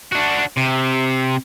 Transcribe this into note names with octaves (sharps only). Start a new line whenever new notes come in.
D4 F#4
C3